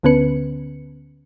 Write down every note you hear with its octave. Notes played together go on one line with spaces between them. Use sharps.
D2 D3 B3 C#4 B4 C#7